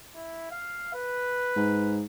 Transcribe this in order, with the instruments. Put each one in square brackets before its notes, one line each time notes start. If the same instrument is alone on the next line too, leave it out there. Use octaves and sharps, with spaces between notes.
[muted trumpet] E4
F5
B4
[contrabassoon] G#2